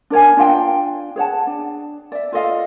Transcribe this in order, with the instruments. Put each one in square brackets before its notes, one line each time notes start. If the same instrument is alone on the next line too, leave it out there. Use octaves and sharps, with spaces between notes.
[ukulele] D4 A#4 C#5 G#5
D4 F4 F5 G5
G#4 C#5 F#5 A5
D4
D5 E5
F4 A4 D#5 F5